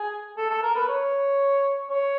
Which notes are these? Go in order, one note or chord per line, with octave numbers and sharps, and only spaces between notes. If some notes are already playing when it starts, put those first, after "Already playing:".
Already playing: G#4
A4
A4
A#4
B4
C#5
C#5